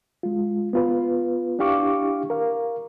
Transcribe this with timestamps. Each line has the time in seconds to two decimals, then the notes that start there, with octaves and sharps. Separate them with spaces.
0.23 G#3 F4
0.73 B3 F4 B4
1.59 D4 E4 G4 F5 C#6 D6
2.30 A#4 F5